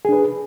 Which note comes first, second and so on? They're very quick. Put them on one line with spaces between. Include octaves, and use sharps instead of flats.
G#4 D4 B4